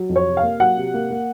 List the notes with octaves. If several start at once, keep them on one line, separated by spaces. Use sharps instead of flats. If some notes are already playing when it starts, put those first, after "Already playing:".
Already playing: F#3
F2
C#5
C3
F5
A#3
F#3 F#5
C3
A#3
A#3